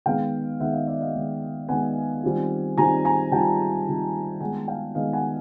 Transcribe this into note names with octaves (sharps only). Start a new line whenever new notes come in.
D#3 G#3 B3 F5 G5
D#3 G#3 B3 E5 F#5
D#5 F5
D5 E5
D#5 F5
D#3 G#3 B3
D#3 G#3 B3 F#5 G#5
D#3 G3 C4 F4
D#3 G3 C4 F4 G#5 A#5
G#5 A#5
D#3 G3 C4 F4 G5 A5
D#3 G3 C4 F4
D#3 G#3 B3 F#5 G#5
F5 G5
D#3 G#3 B3 D#5 F5
F#5 G#5